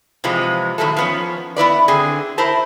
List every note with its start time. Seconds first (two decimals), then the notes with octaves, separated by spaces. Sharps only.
0.24 C3 E3 F3 G#3
0.78 A2 D#3 F#3 E4 A4
0.97 F3 B3 C#4
1.56 B3 E4 B4 D5
1.88 D3 C4 G#4
2.38 E4 A#4 C5 A5